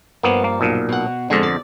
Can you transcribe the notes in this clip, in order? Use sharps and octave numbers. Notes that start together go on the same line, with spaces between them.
G2 F3 A#3 B3
A#3
B1 A#2
B2 F#5
F2 D3 G#3
D5